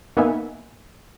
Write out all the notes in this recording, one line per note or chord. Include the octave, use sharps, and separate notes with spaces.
A#3 B3 D#4 E5 G#5